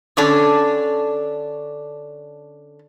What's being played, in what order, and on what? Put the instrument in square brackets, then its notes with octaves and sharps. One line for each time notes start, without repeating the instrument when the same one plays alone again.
[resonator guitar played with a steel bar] D3 C#4 D4 A4